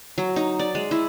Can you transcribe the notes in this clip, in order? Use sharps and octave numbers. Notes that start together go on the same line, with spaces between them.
F#3
D#4
D5
G#3
E4